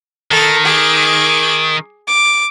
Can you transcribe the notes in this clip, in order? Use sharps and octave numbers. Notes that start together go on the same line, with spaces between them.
D#3 A4
G#4 D6
D6